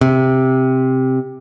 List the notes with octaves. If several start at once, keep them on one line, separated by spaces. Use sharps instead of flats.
C3